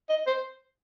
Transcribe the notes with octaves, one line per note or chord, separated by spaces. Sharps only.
D#5
C5